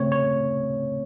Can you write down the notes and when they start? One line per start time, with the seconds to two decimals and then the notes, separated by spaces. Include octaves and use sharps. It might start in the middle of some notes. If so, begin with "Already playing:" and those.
Already playing: C#3 A3 C4 C#5
0.12 C#5